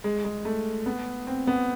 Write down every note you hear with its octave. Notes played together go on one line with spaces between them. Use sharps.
G#3
G#3
A3
B3
C4
B3